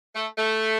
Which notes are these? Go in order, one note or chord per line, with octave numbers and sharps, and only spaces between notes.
A3
A3